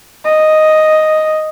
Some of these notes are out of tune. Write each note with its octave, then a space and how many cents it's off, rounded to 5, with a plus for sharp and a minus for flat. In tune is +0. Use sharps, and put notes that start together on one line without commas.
D#5 +0